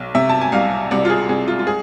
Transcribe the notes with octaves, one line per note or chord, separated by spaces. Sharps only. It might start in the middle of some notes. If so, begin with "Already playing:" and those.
Already playing: B1
C3 E5
A5
G#5
C2 F5
C2 D5
F4
G#4
C2 G#4
F4
F4
G#4